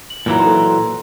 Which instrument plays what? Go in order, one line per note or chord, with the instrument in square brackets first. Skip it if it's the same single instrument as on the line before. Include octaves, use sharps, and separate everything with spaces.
[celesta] F#7
[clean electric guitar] A#2 E3 F#3 [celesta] D#4 A#4 A#5
[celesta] A4 A#5 C6